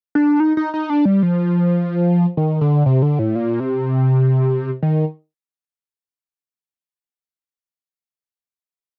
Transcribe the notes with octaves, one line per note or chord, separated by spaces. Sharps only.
D4
D#4
D#4
D#4
D4
G3
F3
D#3
D3
C3
D3
A2
A#2
C3
D#3